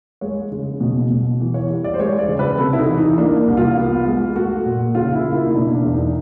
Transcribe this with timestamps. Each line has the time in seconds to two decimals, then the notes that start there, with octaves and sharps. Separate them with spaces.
0.21 G#3 C#5
0.52 C#3
0.81 B2
1.10 B2
1.40 E3
1.54 C#5
1.70 G3
1.84 D5
1.94 C5
1.99 G#3 C#5
2.19 D5
2.28 C#3
2.39 B4
2.58 C3 A4
2.73 E4
2.79 D#4
2.88 E3
2.98 D#4
3.18 A#3 D4
3.47 C2
3.57 F4
3.77 B3
4.07 G#3
4.36 A3 F#4
4.66 A#2
4.95 C#3 F4
5.15 E4
5.25 A#3
5.35 E4
5.45 D#4
5.54 B2 D4
5.75 D4
5.84 E2
5.94 D#4